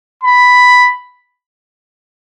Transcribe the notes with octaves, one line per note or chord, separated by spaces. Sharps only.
B5